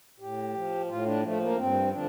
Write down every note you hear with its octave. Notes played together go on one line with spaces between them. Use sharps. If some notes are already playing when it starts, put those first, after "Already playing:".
A2 G4
F3
A2 F4
D4
F3 A3
A#3
G2 C4
D3 F3 D4